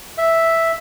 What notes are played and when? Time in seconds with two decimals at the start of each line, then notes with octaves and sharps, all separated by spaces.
0.18 E5